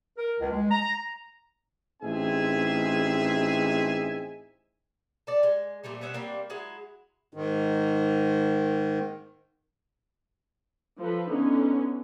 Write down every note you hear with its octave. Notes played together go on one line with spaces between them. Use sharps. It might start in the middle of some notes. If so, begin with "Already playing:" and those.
A#4
C#2
G#3
A#5
A1 C4 D#4 G#4 E5 G#5
A4 D5
G#3
A#2 F3 G3 A3
B2 C#4 E5 F#5
G3 A#3 C4
F#3 G#3 E4
G#2 D#3
F3 A4 B4
D3 B3 C#4 D#4